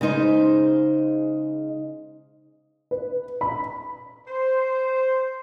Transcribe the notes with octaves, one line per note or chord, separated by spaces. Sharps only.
C#3 G#3 D#4 C5
B4
B5
C5